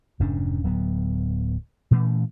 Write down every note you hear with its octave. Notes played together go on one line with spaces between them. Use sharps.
F1 G#2 C#4 D4
D1 F#3 B3
A#2 E3 A3 C#4